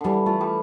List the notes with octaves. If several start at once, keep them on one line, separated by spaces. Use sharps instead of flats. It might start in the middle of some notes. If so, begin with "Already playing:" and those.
D3 E3 G3
A3 F4
G3